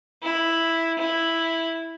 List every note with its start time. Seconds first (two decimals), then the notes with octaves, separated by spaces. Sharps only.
0.23 E4
0.98 E4